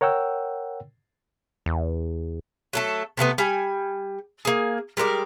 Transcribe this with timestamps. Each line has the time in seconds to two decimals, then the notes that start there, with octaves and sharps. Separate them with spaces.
0.01 A#4 C#5 F#5 G5 E6
1.66 E2
2.73 F#3 A3 A4
3.17 C3 G#3 A3 B3
3.38 G3 G#5
4.45 A#3 G#4
4.97 G3 G#3 A#4 D5